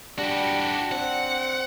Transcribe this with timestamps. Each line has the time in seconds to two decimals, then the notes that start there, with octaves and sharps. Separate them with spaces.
0.19 G3 D4 F#4 G4
0.92 C4 F#5